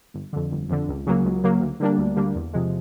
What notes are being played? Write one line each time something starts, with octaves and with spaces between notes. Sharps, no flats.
G1
F2 D3
G1
F2 D3
C#2
C#3 F#3 A#3
C#2
C#3 F#3 A#3
D2
D3 G3 A#3 D4
D2
D3 G3 A#3 D4
E2
C3 F3 G#3